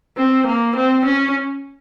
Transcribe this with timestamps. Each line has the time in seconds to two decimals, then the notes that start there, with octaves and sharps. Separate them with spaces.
0.17 C4
0.47 A#3
0.76 C4
1.05 C#4